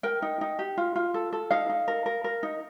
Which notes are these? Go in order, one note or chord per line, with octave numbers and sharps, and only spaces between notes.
A#4 G5
D#4
D#4
G4
F4
F4
A4
A4
D#4 F5
D#4
A#4
A#4
A#4
D#4